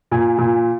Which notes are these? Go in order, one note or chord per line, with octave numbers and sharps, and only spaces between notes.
A#2 G#5
A#2